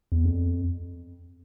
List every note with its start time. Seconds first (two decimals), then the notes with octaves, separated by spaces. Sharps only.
0.12 E2
0.25 F2